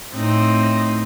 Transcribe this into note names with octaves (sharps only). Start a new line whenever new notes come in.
A2 C4 D#4